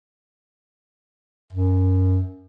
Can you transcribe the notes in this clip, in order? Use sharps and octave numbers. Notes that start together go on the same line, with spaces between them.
F#2